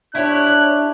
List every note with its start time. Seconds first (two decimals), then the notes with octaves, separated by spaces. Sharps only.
0.15 D4 E4 G4 C#5 F#6